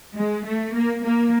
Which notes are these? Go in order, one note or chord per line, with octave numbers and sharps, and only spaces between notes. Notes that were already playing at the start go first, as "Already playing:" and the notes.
G#3
A3
A#3
A#3